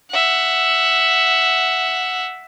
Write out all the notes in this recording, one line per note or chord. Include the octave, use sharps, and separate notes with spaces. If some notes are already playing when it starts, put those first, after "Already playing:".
E5 F#5